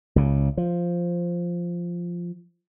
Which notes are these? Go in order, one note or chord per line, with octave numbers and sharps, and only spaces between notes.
C#2 C#3
F3